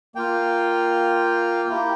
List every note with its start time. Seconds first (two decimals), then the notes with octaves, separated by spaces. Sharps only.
0.15 A#3 F4 G5
1.69 A#3 E4 G4